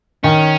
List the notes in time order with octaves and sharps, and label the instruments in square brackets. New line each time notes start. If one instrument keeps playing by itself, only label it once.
[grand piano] D#3 [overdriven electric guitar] C#4